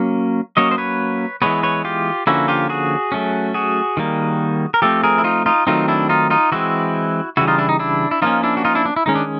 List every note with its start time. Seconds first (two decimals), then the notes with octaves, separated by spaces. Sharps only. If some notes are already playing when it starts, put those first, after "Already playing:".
Already playing: F#3 A#3 C#4
0.57 F#3 A#3 C#4 C#5 D#5
0.71 C5
0.78 B4 C#5
1.42 E3 G#3 B3 B4 C#5
1.63 B4 C#5
1.85 F4 G4
2.27 D3 F3 A#3 C#4 E4 F#4
2.48 F4 G4
2.69 F#4 G#4
3.12 F#3 A3 C#4
3.54 F#4 G#4
3.97 D#3 G3 A#3
4.74 A#4
4.82 F3 A3 C4 G4 A4
5.04 G#4 A#4
5.18 E4
5.24 D#4 F4
5.46 D#4 F4
5.67 D#3 F#3 A3 C4 D#4 F4
5.88 D4 E4
6.09 D#4 F4
6.30 D#4 F4
6.52 E3 G#3 C4 E4 F#4
7.37 C#3 E3 G3 E4 F#4
7.47 D#4 F4
7.58 D4 E4
7.69 D#4
7.79 D4 E4
8.11 E4
8.22 F3 A#3 C#4 D#4 F4
8.43 D4 E4
8.57 F#4
8.65 D#4 F4
8.75 D4 E4
8.86 D4
8.96 E4
9.06 D#3 G#3 C#4 D#4
9.15 D4